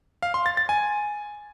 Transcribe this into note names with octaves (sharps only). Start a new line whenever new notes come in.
F5
C6
A6
A6
G#5